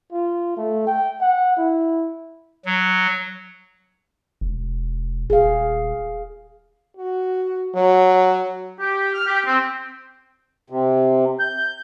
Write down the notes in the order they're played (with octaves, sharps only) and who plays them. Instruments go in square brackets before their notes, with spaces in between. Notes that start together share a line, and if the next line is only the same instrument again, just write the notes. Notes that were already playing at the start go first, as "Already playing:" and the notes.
[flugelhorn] F4
A3
G5
F#5
E4
[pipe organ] F#3
[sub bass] E1
[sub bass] D#1 [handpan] G#4 F5
[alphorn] F#4
F#3
[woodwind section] G4
F6
G4
C4
[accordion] C3
G6